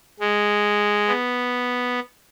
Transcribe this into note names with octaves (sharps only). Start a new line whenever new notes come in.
G#3
B3